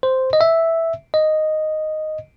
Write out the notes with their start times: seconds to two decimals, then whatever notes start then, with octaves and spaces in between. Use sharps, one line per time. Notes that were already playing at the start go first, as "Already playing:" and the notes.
0.03 C5
0.33 D#5
0.41 E5
1.14 D#5